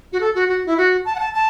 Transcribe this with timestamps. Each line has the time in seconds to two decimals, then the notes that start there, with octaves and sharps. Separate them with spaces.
0.13 F#4
0.21 A4
0.35 F#4
0.49 F#4
0.66 E4
0.77 F#4
1.05 A5
1.15 F#5
1.19 A5
1.34 A5